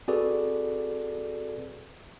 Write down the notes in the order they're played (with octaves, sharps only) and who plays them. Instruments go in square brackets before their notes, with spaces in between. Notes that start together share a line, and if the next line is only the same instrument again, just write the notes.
[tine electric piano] C4 F#4 G#4 A4 B4 D5